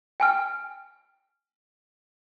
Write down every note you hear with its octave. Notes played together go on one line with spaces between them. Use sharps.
G5 G#5 F6